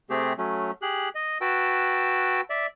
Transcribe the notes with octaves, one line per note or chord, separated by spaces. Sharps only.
C3 A3 C4 G4 G#4
F#3 A3 C#4
G4 G#4 F#6
D#5
F#4 B4 G5 A5 E6
D5 E5